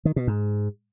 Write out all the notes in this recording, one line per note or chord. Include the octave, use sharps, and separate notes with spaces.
D#3
B2
G#2